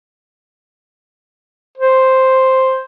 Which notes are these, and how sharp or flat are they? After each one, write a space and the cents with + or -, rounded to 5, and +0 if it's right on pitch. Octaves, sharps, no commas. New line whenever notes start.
C5 +0